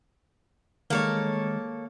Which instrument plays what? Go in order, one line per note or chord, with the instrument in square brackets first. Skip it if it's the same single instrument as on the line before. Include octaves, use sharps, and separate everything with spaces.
[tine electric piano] D#3 G#3 [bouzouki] A#3 A4 C#5